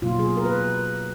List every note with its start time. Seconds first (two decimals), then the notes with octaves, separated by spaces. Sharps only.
0.02 B2 F#3 A#3 F4
0.19 G#4
0.37 A#4
0.45 B4